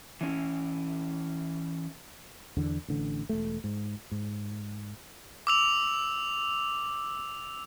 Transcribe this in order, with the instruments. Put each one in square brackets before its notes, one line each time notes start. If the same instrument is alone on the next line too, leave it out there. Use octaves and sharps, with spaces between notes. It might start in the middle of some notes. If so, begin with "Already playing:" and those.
[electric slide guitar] E3 C#4 E4
[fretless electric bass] E2 D3
A1 D3
E1 A3
G#2
G#2
[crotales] D6 E6 F7